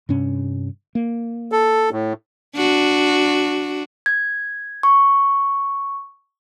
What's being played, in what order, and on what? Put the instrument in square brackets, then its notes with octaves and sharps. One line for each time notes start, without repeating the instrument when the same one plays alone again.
[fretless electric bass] G2 C3 C#4
A#3
[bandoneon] A4
A2
[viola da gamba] D4 F#4
[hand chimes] G#6
C#6